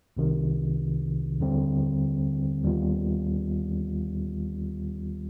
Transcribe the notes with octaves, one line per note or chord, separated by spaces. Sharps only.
C2 C3 D#3
D#2 D3 G3 C4
D#2 D#3 G3 B3 F4